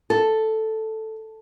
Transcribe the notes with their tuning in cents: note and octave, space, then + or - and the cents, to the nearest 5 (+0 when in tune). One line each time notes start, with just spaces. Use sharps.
A4 +0